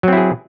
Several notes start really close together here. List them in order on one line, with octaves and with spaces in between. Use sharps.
F#3 C4 E4 G#4